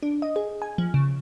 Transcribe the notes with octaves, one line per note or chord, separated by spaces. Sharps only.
D4
D#5
G#4
G#5
F3
C#3